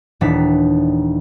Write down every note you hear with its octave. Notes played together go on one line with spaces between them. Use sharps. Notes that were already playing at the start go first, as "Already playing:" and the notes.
D#1 E3 D4 D#4 B6